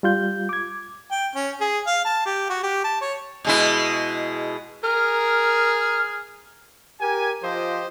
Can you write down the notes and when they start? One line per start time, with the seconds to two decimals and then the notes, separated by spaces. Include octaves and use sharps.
0.03 G3 F4 G6
0.49 D6 G#6
1.11 G5
1.35 C#4
1.61 G#4
1.87 F5
2.05 A5
2.26 G4
2.50 F#4
2.63 G4
2.84 A5
3.01 C#5
3.45 B2 G#3 E4
4.84 G#4 A#4 F6
7.00 G4 A#4 G#5
7.43 F3 F4 G4 C5 D#5